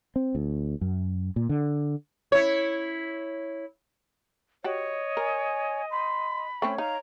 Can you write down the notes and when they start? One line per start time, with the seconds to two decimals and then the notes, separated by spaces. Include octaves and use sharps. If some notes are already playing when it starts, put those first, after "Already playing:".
0.16 C4
0.35 D2
0.81 F#2
1.36 A#2
1.49 D3
2.32 E4 C#5
4.64 F#4 G4 C#5 D#5
5.17 A#4 G#5
5.91 B5 C6
6.62 A3 C4 C#4 C#5 G5
6.78 D#4 F5 A#5